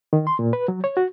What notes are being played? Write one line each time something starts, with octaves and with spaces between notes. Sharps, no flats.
D#3
C6
A#2
B4
F#3
C#5
F#4